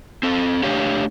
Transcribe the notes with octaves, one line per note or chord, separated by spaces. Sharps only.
C4 A4
A3 D4 G4 C#5 F5